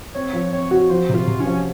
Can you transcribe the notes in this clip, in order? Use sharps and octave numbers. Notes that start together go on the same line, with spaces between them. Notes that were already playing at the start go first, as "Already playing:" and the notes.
C4 C#5
F3
C4 C#5
F#4
F3 C5
C3
F4
C3
C#4
F3